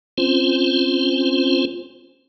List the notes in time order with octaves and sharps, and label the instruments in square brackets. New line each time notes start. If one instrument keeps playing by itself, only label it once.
[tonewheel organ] C4 C#4 F4 C5